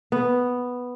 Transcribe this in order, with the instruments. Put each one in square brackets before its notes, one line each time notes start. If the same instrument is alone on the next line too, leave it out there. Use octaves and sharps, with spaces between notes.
[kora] B3